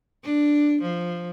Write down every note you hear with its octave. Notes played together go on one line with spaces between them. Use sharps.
D4
F3